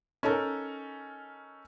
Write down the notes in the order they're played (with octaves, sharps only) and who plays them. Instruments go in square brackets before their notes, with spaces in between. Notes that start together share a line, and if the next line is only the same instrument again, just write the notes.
[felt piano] C#4 D#4 A4 A#4